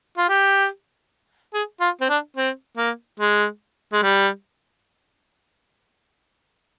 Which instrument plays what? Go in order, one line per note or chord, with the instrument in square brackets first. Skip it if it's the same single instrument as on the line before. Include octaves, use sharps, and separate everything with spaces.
[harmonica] F4
G4
G#4
F4
C4
D4
C4
A#3
G#3
G#3
G3